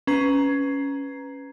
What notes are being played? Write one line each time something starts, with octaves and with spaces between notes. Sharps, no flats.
C#4 B4 A#5 G#6 C7